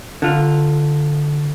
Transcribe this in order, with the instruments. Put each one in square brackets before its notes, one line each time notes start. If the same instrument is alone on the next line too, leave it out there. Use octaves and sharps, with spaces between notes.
[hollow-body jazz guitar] D3 F4